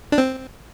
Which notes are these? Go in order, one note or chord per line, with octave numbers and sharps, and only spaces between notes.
D4
C4